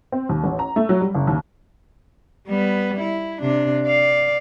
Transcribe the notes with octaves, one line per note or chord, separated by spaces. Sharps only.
C4
D#2
A1
A#5
A3
F#3
G3
F#1
D#2
G3 B3
E4
C3 D4
D5 F5